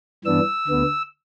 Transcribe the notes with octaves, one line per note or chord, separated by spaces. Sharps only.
G2 E3 B3 D4 E6
D2 D3 B3